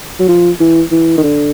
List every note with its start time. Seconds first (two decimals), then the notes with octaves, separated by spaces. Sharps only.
0.20 F#3
0.29 F3
0.60 E3
0.91 E3
1.18 D#3
1.23 D3